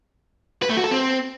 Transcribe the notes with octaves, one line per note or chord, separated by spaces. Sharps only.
B4
A3
F#4
A4
C4